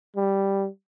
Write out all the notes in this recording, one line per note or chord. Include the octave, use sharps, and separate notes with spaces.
G3